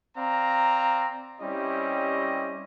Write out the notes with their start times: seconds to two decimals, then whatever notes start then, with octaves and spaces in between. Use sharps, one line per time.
0.17 C4 D5 F5 A#5
1.41 G3 C4 C#4 E4 G4 D#5